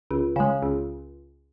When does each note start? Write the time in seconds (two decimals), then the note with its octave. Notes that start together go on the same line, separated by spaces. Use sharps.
0.11 C#2
0.36 C#3 G#3
0.63 C#2